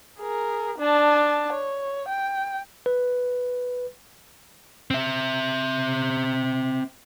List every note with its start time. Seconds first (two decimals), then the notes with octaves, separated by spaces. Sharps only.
0.19 G#4 A#4
0.78 D4 A5
1.53 C#5
2.09 G5
2.86 B4
4.91 C4 E5